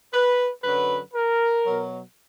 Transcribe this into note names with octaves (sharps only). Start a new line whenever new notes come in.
B4
F#2 D3 F#3 B4
A#4
B2 F#3